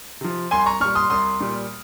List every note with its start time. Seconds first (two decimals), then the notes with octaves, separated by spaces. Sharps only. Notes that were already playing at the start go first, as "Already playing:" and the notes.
0.21 C3 F3
0.51 C2 G#5 C6
0.66 A#5 C#6
0.81 A#2 G3 C#6 F6
0.95 C6 D#6
1.10 C2 C6 D#6
1.41 A#2 G3